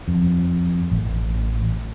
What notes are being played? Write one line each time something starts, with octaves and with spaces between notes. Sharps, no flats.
F2
A1